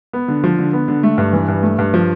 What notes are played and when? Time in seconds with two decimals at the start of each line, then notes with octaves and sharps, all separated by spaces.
0.13 B3
0.28 D3
0.44 F3
0.58 D3
0.73 B3
0.88 D3
1.03 A3
1.18 G2
1.33 E3
1.48 G2
1.63 A3
1.79 G2
1.94 F3